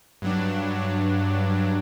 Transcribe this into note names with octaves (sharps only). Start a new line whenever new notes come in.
G2 F#3 D4